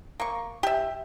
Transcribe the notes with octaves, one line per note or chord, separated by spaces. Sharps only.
A#3 C#6
G4 E5